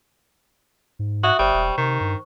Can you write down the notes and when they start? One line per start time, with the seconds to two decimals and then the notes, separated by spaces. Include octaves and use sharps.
0.99 G#2
1.23 F#4 E5 D#6 F#6
1.39 G1 G3 C5 C#6
1.54 E1
1.78 C3 D#3
2.01 G2